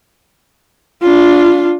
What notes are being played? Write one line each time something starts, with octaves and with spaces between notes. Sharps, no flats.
D4 F4